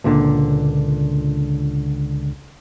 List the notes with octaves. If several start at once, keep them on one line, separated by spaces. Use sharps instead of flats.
C#2 A#2 D3